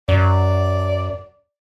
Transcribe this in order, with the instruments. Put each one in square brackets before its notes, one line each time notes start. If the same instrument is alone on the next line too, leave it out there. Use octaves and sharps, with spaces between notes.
[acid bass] F#2 [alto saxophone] D5